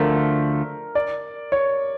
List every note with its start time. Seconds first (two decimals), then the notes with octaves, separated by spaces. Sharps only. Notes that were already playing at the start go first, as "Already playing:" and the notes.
Already playing: D2 D3 F3 A3 A#4
0.95 D5
1.52 C#5